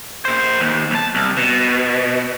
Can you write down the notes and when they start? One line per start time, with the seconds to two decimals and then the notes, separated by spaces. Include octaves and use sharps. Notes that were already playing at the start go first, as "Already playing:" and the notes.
0.25 A#2 C5
0.60 D#2
0.91 B1 A5
1.15 C2
1.37 B2